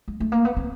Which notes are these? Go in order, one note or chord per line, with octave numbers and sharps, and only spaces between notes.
G#3
A3
A#3
B3
C4